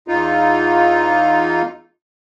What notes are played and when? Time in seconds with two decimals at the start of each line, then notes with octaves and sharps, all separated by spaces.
0.08 E2 D#4 F4